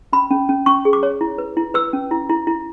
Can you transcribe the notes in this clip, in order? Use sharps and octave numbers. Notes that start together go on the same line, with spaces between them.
C#4 B5
C#4
C#4
C#4 C#6
G#4
D6
C#5
E4
B4
E4
B4 E6
C#4
E4
E4
E4